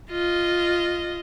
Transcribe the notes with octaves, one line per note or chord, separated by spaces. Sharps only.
F4 D#5